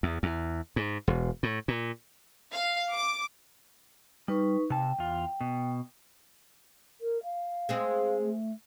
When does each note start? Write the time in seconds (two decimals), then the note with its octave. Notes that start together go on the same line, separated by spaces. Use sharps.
0.03 E2
0.23 E2
0.76 G#2
1.08 E1
1.43 A2
1.68 A#2
2.52 F5
2.92 D6
4.28 G3 D#4 B4 C#6
4.70 C3 G5 A5
4.98 E2 F4
5.41 B2
7.01 A#4
7.23 F5
7.69 G#3 C4 G#4
8.20 A3